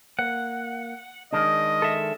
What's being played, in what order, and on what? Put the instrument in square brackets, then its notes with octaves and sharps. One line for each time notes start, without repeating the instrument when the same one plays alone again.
[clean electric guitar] A#3 [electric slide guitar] F#5
[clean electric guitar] D#3 G#3 D4 [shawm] D#5
[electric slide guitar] A4 E5